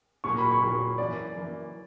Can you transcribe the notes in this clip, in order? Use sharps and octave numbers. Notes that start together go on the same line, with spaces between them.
A#2 F#3 A#3 C#6
B5
C#6
A#2 F#3 A#3
F#2 E3 A#3 D5
F#2 E3 A#3